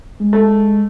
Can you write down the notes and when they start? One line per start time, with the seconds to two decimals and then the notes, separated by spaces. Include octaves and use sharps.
0.20 G#3
0.33 A3